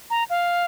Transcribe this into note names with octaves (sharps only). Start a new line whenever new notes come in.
A#5
F5